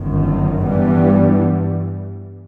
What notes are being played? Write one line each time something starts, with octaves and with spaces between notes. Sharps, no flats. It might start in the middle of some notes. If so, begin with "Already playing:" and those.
Already playing: G1 F#2 D#3
G2 E3 G3 B3